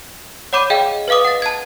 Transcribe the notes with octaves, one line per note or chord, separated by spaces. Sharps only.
C#5 F#5 B5 D6 G6 D#7
G#4 D#5 F5 G5
B4 D#5 F5 D6 D#6
F#5 A6
A5 G#6